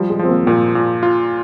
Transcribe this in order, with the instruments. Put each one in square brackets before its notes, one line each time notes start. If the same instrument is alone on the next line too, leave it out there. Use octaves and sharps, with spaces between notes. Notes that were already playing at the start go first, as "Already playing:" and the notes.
Already playing: [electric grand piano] F3 [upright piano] G3
[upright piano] G#3
[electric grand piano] F3 [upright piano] C4
[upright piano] A#3
[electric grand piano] A#2 [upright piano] A#3
[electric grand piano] A#2
F4